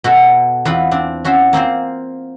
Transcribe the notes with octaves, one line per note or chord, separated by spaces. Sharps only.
B2 F#4 A4
E2 B3 C4 F4 B4 B5
C4 D4
C#4 F#4 C5 E5
A#3 C4 F4 C5